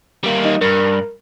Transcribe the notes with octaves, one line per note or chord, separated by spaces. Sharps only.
G3 A#3
D#4
G2 A#4